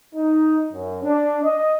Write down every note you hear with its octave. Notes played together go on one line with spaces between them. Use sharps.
D#4
F#2
D4
D#5